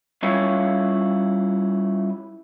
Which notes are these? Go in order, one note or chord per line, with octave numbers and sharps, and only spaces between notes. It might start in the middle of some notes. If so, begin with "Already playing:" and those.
G3 C#4 E4 F4 C#5 F5